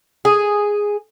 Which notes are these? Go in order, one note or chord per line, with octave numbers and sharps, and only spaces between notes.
G#4